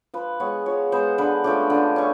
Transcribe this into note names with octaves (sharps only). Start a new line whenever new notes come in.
F3 B4
G#3 B3 C#5
F3 C#5
G#3 B3 C5
D3 B4
F3 A3 C#4 G4
D3
A3 C#4